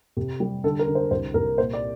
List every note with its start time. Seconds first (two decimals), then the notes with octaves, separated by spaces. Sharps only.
0.17 C3
0.40 G3
0.64 D3 A4
0.79 A#4
0.87 D3
0.95 C5
1.11 C2 C5
1.34 C2 A#4
1.58 A#2 C5
1.73 D5